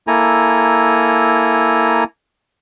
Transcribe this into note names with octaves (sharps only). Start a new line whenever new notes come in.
A#3 E4 A4 G#5 A#5